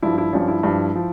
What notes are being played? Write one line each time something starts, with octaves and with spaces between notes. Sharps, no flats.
G2 F3 E4
E4
G2 F3 C#4
E4
G2 F3
F3